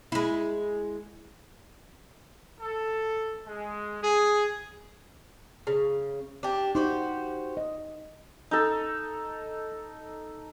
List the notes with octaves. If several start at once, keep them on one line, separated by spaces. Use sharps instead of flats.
G#3 E4
A4
G#3
G#4
C#3
D4 G4
D#4 F#4 G4 C5
D#5
D#4 A4